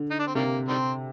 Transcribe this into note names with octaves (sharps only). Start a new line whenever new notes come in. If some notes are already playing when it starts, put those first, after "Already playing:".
Already playing: D3
D#4
D4
C4
C3 D#3 G3 A#3
D#3 G3 C4